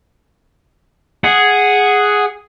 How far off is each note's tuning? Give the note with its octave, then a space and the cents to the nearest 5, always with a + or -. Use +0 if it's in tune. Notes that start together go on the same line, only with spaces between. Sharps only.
G#4 +0 F#5 +0